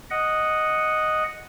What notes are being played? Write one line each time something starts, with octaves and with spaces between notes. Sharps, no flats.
D#5 F#5